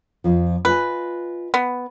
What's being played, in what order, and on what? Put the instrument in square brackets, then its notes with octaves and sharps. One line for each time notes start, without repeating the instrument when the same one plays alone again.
[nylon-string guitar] F2 F3
[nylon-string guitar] F4 D#5 G#5 [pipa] B4
[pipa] B3